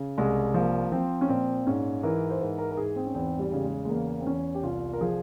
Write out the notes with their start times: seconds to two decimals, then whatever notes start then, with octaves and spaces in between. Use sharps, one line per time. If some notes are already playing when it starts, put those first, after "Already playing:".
Already playing: C#3
0.18 C2 G#3
0.54 F3 A#3
0.92 F3 C4
1.21 C#4
1.29 A#2 C4
1.66 G#2 C#4
2.03 E3 A#4
2.30 C5
2.40 G#2 A#4
2.58 A#4
2.71 A#4
2.77 G#2 G#4
2.96 C4
3.06 C#4
3.15 E2 C4
3.39 G3
3.52 C#3 G3
3.64 G#3
3.85 G#3
3.89 E2 A#3
4.21 C4
4.26 E2 C#4
4.55 G4
4.63 C2 F4
4.93 A#4
5.01 F3 G#4